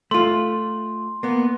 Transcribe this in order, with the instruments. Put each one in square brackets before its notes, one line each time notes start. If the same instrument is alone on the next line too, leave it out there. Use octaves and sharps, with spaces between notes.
[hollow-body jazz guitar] A3 F4 [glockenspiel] C6
[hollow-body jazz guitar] A#3 B3